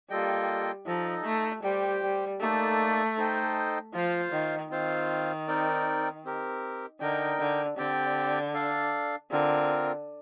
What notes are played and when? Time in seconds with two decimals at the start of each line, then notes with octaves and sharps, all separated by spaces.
0.10 G3 A#3 F4 A4 D#5 G5
0.87 F3 D#4 A4 D#5
1.25 A3
1.63 G3 G4 C5 G5
2.02 G3
2.40 A3 A#3 D#4 A4 D5
3.17 D#4 A4 C5 D#5 G5
3.94 F3 F4 C5 F5
4.32 D#3
4.71 D#3 C4 F4 C5 F5
5.47 C4 D#4 A#4 D5 G5
6.24 C4 G4 A#4
7.01 D3 D#4 A#4 D#5 G5
7.39 D3
7.77 D3 C4 G4 D5 G5
8.54 D4 A4 D5 F5
9.31 D3 C4 F4 A#4